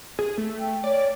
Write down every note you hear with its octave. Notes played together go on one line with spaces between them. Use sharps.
G#4
A3
G5
C#5 D5